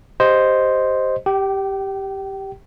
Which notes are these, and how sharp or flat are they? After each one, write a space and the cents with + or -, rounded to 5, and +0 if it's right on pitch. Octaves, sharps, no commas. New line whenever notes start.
G4 +0 C5 +0 D#5 +0
G4 +0 G5 -30